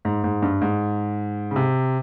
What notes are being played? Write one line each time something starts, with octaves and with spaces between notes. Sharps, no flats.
G#2
G#2
G2
G#2
C#3
C3